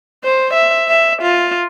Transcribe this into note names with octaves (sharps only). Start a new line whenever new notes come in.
C5
E5
E5
F4